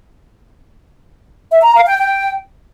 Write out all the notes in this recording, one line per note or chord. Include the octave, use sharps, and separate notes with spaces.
E5
A#5
F5
G5
G5